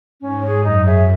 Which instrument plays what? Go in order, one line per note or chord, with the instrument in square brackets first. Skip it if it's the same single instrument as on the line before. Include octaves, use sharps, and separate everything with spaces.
[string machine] G#2 [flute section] C#4
[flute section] G#4 C#5
[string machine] F#2 [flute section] D#4
[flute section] G#4 C#5 E5